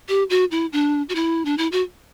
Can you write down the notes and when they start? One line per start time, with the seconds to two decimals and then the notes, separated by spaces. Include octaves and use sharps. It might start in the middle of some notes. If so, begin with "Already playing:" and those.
0.09 G4
0.30 F#4
0.51 E4
0.72 D4
1.09 F#4
1.15 E4
1.45 D4
1.58 E4
1.72 F#4